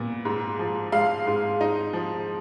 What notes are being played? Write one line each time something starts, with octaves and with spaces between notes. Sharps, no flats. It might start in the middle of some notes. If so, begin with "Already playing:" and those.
Already playing: A#2 B3
G#2
F3
G#3 F5
G#2
D#4
F3